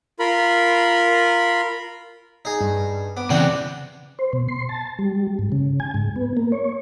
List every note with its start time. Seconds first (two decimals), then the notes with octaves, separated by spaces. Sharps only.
0.19 F4 A#4 B5
2.45 D#4 G#4
2.60 G2
3.17 B3 D6
3.30 C#3 E3 C4 D4 F#5 G5
4.19 C5
4.33 B2
4.48 C6
4.69 A5
4.99 G3
5.39 G#2
5.52 C#3
5.80 G#5
5.94 G#2
6.16 B3
6.37 A#3
6.52 C#5